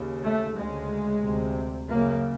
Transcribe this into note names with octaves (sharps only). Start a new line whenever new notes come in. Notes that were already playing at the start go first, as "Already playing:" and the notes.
Already playing: D#2 C#3
A3
D2 C#3 G#3
D2 C3
F#2 C#3 A#3